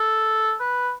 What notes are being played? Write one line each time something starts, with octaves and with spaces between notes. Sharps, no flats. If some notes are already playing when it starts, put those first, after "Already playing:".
Already playing: A4
B4